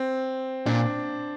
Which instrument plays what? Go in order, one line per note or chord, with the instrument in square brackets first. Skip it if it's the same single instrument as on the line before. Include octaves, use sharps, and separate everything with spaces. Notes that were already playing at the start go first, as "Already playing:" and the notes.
Already playing: [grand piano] C4
[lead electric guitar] A#2 [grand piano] D4